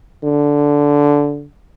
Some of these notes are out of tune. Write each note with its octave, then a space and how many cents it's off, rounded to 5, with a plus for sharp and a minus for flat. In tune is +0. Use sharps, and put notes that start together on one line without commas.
D3 -10